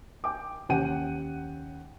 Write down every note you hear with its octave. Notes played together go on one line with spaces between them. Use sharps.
G5 D6
D#2 C#4 F#5 G5 D#7